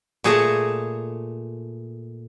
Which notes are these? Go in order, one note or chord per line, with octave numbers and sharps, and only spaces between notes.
A#2 A3 G#4 C#5 A5 A#5